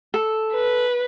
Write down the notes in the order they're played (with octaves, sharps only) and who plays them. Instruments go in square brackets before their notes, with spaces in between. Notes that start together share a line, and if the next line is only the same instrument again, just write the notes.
[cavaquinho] A4
[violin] B4